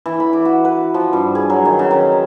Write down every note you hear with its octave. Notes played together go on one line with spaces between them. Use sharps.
E3
B5
D6
F#4
B4
F3
G2
G#4
F#3
D#3
C#3
D#3